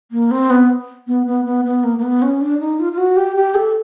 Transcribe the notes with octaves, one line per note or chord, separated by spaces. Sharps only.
A#3
C4
B3
B3
B3
B3
B3
A#3
A#3
B3
C#4
D4
D#4
F4
F4
F#4
G4
G4
A4